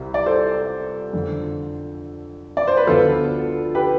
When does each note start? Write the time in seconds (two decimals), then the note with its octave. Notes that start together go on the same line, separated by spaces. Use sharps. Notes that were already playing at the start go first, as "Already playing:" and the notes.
Already playing: C2 C3 G3
0.14 D5
0.26 A4 C5
1.13 F2 D3 F3
2.57 D5
2.67 C5
2.77 B4
2.87 D2 D3 F3 B3 F4 A4
3.75 G4 B4